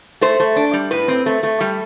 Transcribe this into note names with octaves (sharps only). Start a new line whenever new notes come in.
A3 C5
A3
D4
G3
A2 B4
C4
A3
A3
G3